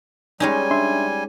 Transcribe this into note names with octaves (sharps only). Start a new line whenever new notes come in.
G3 G#3 C#4 D#4 G#5
D4 E5 C6